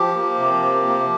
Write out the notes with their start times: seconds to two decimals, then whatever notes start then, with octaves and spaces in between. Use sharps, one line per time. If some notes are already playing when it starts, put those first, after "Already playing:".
Already playing: F3 G4
0.15 A#3
0.38 C3
0.62 F3
0.87 A#3